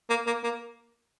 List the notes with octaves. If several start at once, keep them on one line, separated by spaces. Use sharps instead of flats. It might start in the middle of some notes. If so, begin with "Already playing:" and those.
A#3
A#3
A#3